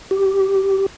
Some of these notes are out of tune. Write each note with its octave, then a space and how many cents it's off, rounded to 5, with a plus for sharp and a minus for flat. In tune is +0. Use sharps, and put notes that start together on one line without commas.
G4 -15